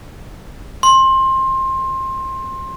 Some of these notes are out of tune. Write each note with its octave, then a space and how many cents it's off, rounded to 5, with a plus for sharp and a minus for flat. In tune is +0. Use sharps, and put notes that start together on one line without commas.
C6 +20